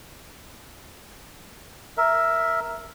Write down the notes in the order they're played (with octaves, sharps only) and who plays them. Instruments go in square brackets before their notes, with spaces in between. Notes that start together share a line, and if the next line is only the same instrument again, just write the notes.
[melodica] A#4 E5